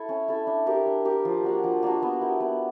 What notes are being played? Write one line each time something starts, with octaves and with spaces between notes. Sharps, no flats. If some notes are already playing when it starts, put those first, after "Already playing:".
Already playing: E4 A4
C#4
E4 A4
D4
G4 A#4
D4
G4 A#4
F3
A#3 D4 F#4
F3
A#3 D4 F#4
B3
E4 G4 A#4
B3